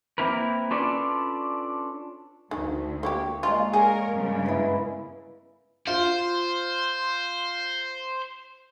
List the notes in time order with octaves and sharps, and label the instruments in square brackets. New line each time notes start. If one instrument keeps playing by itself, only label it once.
[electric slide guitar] A#3 C4 E4 A#4 B4
C#4 D4 F4 A4 B4 D5
[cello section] D2 [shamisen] D#3
[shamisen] A#3 E4 G4 [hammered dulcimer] C#5
[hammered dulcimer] G#3 A#3 D5 [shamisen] F4
[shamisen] G#4 [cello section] A#4 C#5
[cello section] G2 C#3
[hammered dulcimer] B3 E4
[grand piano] F4 [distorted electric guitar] C5